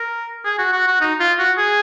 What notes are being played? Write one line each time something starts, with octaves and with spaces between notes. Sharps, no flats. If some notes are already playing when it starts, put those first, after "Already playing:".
Already playing: A#4
G#4
F#4
F#4
F#4
D#4
F4
F#4
G#4